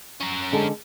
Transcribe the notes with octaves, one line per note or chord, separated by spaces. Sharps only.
C#4 A#4
D3 G#3 A4